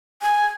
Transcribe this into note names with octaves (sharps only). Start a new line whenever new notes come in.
G#5